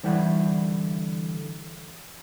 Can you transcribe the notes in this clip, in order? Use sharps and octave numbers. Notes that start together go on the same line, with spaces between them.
D3 E3 G3 E4 F#5